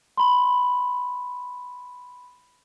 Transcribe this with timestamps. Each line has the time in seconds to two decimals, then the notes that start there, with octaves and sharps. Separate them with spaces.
0.17 B5 C6